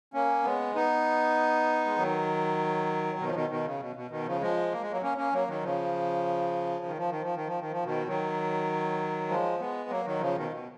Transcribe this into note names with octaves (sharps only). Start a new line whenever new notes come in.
A#3 C#4
G#3 B3
B3 D#4
G#3
D#3 F#3
B2 D#3
F3
B2 D#3
B2 D#3
C#3
B2
B2
B2 D#3
C#3 F3
F3 G#3
A#3
G#3
F#3 A#3
A#3 C#4
A#3 C#4
F#3 A#3
D#3 F#3
C#3 F3
D#3
F3
D#3
F3
D#3
F3
D#3
F3
B2 D#3
D#3 F#3
F3 G#3
G#3 B3
F#3 A#3
D#3 F#3
C#3 F3
B2 D#3
B2